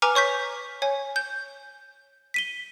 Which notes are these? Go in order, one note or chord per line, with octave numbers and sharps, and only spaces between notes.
B4 G#5 A#5 D6 F6
C#5 C#6 G6 B6
C#5 G#5
G6
B6 D#7 G7